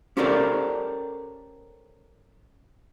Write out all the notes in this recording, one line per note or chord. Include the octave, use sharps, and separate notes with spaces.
C#4 G4 A4 A#4 C5 D5